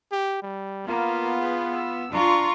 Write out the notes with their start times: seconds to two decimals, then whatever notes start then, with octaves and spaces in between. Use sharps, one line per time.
0.12 G4
0.42 G3
0.87 A#3 B3 F4
1.38 G#4 B4
1.75 E6
2.13 D4 F4 A#5 C#6